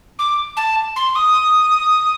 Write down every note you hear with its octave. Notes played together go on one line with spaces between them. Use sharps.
D6
A5
C6
D#6